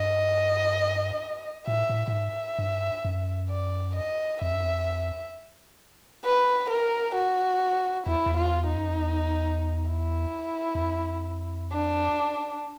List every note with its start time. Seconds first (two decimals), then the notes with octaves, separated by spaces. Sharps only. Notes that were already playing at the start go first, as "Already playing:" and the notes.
Already playing: G2 D#5
1.67 A2 E5
1.90 A2
2.08 A2
2.12 G#2 E5
2.59 G2
3.05 F#2
3.49 D5
3.96 D#5
4.42 F2 E5
4.52 F#2
4.63 F2
6.25 B4
6.70 A#4
7.15 F#4
8.07 E2 E4
8.26 E2
8.37 F4
8.68 D#4
8.75 F#2
8.87 F2
8.98 E2
9.91 E4
10.75 E2
10.81 F2
11.73 D4